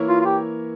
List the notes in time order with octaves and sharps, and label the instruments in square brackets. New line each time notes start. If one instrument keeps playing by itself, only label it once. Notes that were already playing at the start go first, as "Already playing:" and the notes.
Already playing: [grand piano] E3 A#3 E4 A#4 C#5
[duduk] F4
F4
G4